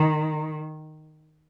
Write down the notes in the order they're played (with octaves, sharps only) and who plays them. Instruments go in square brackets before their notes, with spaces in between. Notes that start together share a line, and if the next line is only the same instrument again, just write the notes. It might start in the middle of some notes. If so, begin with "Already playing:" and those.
Already playing: [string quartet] D#3